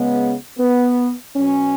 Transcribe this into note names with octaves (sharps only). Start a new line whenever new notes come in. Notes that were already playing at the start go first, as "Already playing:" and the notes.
Already playing: C#3 G#3 B3
B3
B2 F#3 C#4